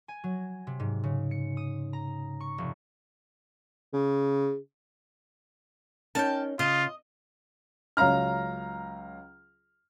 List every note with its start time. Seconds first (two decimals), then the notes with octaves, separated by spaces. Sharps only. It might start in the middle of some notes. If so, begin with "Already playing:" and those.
0.08 G#5
0.24 F#3
0.67 C3
0.80 G#2
1.04 C#3
1.31 C#7
1.57 D#6
1.93 A#5
2.40 C#6
2.58 F1
3.93 C#3
6.15 C#4 D#4 A#4 G5 A5
6.59 C#3 F4 D#5
7.97 C#2 F#3 F5 A#5 F6